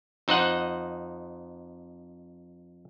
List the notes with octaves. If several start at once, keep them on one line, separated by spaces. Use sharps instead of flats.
F2 D#4 C5 D#5 F#5